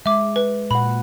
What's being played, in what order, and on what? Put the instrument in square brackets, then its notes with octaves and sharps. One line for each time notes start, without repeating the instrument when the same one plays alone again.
[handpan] G#3 [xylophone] E5 D6
[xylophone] B4
[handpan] A#2 F#5 [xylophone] B5